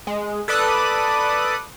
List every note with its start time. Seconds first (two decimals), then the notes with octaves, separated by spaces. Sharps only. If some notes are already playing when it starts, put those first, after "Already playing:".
0.07 G#3
0.48 A4 B4 D5 D#6 F#6